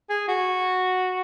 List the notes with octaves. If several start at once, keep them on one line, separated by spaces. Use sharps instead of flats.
G#4
F#4